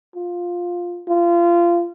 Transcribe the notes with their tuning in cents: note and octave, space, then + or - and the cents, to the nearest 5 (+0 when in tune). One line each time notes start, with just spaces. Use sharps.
F4 +10
F4 -25